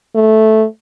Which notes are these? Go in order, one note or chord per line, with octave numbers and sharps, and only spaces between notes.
A3